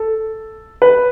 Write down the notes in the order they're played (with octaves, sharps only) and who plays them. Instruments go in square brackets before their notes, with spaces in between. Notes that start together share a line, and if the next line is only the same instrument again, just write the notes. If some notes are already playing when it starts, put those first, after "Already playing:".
Already playing: [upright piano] A4
B4